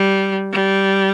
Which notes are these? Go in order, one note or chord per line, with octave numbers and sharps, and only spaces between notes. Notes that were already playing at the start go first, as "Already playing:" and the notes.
Already playing: G3
G3